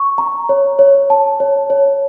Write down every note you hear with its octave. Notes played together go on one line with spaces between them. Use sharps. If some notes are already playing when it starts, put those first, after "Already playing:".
Already playing: C#6
A#5
C#5
C#5
A5
C#5
C#5